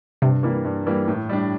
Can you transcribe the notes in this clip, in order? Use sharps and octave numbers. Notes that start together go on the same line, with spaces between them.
G2 C3
E3 G3 A#3
G2
E3 G3 A#3
A2
G3 D4